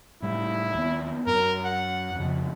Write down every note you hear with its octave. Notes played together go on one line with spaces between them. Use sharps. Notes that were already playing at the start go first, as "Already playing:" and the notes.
A2 G3 E4
D#2 B3
F#2 A#4
F#5
F2 C#3